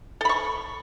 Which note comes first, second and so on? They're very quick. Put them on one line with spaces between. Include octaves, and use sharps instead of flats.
A4 B5 C#6